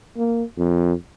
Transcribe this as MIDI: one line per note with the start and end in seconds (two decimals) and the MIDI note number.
0.17 0.43 58
0.57 0.93 41